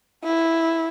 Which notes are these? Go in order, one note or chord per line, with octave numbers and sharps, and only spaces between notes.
E4